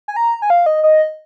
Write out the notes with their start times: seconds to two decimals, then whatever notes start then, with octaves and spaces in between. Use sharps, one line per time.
0.08 G#5
0.16 A#5
0.42 G#5
0.50 F5
0.66 D#5
0.84 D#5